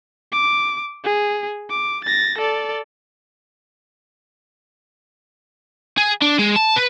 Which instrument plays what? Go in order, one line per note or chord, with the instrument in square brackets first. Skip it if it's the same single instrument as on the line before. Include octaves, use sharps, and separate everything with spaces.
[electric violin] D6
G#4
D6
A6 A#6
A4 D5
[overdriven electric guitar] G#4
D4
G#3
A5
B4